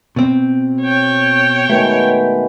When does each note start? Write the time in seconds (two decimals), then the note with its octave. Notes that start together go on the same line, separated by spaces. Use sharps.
0.16 B2 C4
0.81 C#5 G5
1.70 B2 D#3 G#3 A3